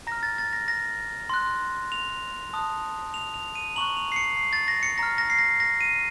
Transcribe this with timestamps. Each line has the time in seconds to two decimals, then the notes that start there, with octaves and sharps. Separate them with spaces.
0.07 A#5 F6 A#6
0.23 A6
0.38 A6
0.53 A#6
0.68 A#6
1.30 C6 F#6
1.92 F7
2.53 A5 D#6 F#6
3.14 F7
3.34 F7
3.55 D#7
3.76 A#5 C#6 F#6 F#7
3.97 F7
4.12 C7
4.16 C#7
4.37 C7
4.53 A6
4.68 A#6
4.83 C#7
4.98 A#5 F6 A#6
5.18 A#6
5.30 C7
5.39 A#6
5.60 A#6
5.81 D#7